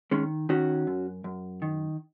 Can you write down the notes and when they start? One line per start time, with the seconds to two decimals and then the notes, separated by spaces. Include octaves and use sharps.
0.11 D#3 G#3 C#4
0.49 D#3 C#4 F#4
0.87 F#2
1.24 F#2
1.62 D#3